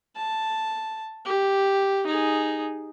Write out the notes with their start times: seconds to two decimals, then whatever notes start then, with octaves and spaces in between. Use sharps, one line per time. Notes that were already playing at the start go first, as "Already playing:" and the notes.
0.16 A5
1.25 G4
2.06 D#4 G#4